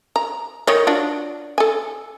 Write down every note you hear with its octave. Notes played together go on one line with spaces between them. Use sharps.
A#5
D#3 D#4 C#5
D4 F4 F#4
A4 G#5